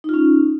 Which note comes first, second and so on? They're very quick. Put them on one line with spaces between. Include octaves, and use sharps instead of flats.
D#4 F4 C#4